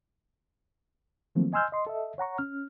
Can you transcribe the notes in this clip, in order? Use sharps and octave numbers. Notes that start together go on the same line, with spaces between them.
D#3 F3 F#3 A3 A#3 C4
D#5 G#5 C6 E6 F6 G6
D#5 C6
A4 D#5 E5
C#5 F#5 A#5 C#6
C#4 F6